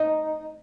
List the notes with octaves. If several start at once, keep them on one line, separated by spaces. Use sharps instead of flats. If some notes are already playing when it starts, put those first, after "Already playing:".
Already playing: D#4